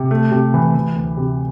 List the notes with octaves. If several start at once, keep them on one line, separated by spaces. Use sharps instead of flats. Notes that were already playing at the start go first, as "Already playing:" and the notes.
Already playing: C3
A3
C3
E3
E3
D2
C3